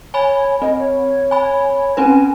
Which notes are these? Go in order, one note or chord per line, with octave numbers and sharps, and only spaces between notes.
C#5 G#5 B5
C4 D#5
C#5
G#5 B5
C4 C#4 B4 G#5